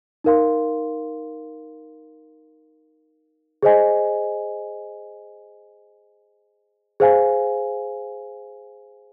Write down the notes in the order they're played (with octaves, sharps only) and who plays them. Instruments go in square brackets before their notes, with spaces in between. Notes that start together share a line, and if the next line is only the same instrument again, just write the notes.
[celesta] D#4 A#4 F5 C6
G#4 C5 D#5 G#5
G#4 C5 F5 G#5